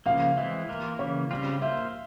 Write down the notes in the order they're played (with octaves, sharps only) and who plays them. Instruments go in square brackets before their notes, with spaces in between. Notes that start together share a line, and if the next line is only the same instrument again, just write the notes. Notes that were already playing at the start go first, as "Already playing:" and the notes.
[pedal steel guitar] C#3 F3 A#3 [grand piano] F5
[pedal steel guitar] E3 G#3 C4 E4 [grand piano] E5
[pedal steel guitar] E3 A#3 F4 A#4
[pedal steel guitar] C#3 E3 A#3 [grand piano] C#5
[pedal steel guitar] C#3 G3 C4 F4
[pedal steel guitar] A#3 F4 C5 [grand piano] E5